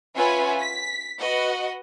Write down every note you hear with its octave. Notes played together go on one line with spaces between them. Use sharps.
C#4 F4 B4 E5 F#5 G#5
B6
F#4 B4 D#5 F#5